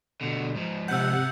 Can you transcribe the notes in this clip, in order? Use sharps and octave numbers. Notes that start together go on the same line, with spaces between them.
B2 D3
G#2 F3
C3 F#5 E6 G6